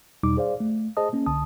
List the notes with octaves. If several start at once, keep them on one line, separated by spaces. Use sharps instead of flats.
E2 B2 G3 D#4 D6
G#4 C5 D5 F5
A3
G#4 C5 D#5 A5 D#6
A#3 C#4
C2 D3 A5 D#6